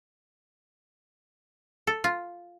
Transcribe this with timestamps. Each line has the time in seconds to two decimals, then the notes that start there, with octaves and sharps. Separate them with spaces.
1.87 A4
2.04 F4